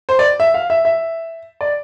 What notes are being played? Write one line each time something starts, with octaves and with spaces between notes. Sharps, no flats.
C5
D5
E5
F5
E5
E5
D5